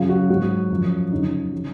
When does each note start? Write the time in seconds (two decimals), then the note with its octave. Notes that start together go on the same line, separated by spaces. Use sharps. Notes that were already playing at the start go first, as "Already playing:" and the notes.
Already playing: F#2 C#3 F#3 F4
0.09 F#4
0.30 G#2 F#3 F#4
0.70 F#2 F3
1.12 F#2 C#3 F3 D#4
1.52 C#3 F#3